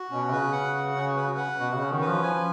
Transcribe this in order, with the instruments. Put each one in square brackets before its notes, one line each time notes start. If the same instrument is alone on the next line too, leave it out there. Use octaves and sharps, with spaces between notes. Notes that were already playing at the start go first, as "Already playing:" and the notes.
Already playing: [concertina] F#4
[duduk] B2 [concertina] C#4
[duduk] C#3 [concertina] B4
[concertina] F#5
F#4
C#4
B4
F#5
[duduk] B2 [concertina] F#4
[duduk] C#3 [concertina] C#4
[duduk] D#3
[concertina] B4
[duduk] F3
[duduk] F3 [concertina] G#5